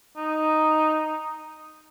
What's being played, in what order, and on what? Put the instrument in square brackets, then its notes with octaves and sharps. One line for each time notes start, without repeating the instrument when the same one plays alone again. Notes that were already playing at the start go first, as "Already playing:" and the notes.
[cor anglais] D#4